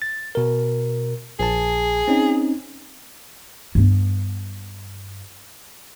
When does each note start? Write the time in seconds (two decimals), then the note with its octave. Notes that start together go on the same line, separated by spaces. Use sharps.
0.02 A6
0.35 B2 A#4
1.40 A#1 G#4 A5
2.08 C4 C#4 D#4
3.75 G2 B3